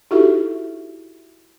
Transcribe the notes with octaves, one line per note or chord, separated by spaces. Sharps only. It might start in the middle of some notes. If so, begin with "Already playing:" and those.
D#4 E4 F#4 G4 A4 E5